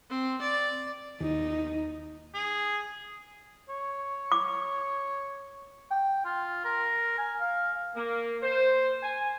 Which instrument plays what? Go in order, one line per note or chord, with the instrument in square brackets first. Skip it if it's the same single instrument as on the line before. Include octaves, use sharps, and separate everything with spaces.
[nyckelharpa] C4
D5
[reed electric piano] D#2 [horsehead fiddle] D#4
[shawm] G#4
[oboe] C#5
[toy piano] D6
[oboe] G5
F4
A#4
G#5
F5
[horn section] A#3
C5
G#5